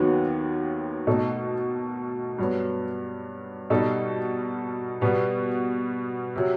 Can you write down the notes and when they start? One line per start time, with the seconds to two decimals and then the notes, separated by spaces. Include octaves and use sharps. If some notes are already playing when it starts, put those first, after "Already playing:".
Already playing: D#2 D#3 F#3 B3 F#4
1.07 B2 A3 D#4 A4
2.38 G2 F#3 B3
3.70 B2 G3 D#4 A4
5.01 B2 G3 B3
6.36 C3 F#3